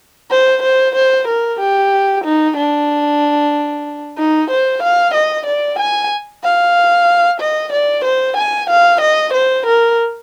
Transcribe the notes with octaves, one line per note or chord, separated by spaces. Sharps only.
C5
C5
C5
A#4
G4
D#4
D4
D#4
C5
F5
D#5
D5
G#5
F5
D#5
D5
C5
G#5
F5
D#5
C5
A#4